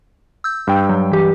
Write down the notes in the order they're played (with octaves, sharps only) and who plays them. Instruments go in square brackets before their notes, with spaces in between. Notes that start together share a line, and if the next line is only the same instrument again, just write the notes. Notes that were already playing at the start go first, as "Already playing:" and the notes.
[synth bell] E6 G6
[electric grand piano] G2 G5
[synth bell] F#3
E3 G4